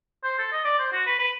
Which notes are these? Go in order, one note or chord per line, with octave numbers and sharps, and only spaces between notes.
C5
A4
D#5
D5
C5
F#4
B4
B4